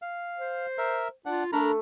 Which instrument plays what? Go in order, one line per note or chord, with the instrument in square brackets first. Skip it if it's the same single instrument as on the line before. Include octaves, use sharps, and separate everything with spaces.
[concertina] F5
[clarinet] C5
[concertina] A#4 E5
[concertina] D4 F#5 [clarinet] F4
[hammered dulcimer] A3 [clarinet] D4 [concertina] A#4 A#5 B5